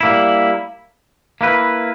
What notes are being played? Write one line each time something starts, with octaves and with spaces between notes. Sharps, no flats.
G3 A#3 E4
A#3 E4 B4